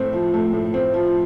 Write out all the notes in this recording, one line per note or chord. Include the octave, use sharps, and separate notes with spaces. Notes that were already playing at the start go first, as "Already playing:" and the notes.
Already playing: A2 A3 C4
F3
A3
A2
C4
F3